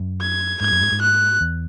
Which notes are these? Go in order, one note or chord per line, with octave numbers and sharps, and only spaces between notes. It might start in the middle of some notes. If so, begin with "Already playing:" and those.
Already playing: F#2
G#6
G#2 G#6
F#2
G#2
G#2
F#6
E2